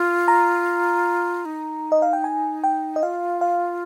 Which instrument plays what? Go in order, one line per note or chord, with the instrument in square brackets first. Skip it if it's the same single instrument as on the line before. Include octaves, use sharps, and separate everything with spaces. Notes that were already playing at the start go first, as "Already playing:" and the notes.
Already playing: [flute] F4
[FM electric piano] A#5
[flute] D#4
[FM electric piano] D#5
F5
G5
G#5
G5
D#5
[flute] F4 [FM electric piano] F5
[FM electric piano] F5